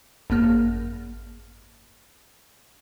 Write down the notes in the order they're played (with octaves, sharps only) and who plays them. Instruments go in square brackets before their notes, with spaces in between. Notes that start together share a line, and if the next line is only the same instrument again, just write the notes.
[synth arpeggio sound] G#1 F#2 A#3 F6